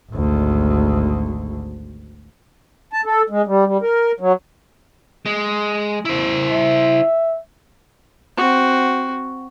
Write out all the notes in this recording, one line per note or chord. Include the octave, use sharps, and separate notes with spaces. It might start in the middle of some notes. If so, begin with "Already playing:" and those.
G#1 D2
A5
A4
G#3
G3
G3
A#4
F#3
G#3
E4 C5
E5
C4 F#4